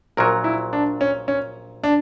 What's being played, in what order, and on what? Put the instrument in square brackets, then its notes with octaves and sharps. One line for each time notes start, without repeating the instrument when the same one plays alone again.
[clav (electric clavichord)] A#1 A#2 F#3 [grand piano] A#4
[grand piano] E4
D4
C#4
C#4
D4